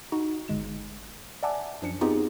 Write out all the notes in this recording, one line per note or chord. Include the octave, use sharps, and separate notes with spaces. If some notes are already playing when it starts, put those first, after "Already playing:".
D#4 F#4
G1 G#3 E7
D5 E5 F#5 G#5 A5 D6
F#2 F3 D4 C#7
B3 C4 D#4 F4 G4 G#4